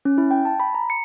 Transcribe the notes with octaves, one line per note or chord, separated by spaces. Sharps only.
C#4
E4
G5
A5
B5
A#5
C#7